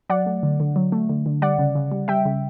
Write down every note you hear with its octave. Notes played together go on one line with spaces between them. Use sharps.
F#3 D5 F#5
A3
D3
D3
F#3
A3
D3
D3
G3 D5 F#5
C#3
C#3
G3
G3 E5 G5
C#3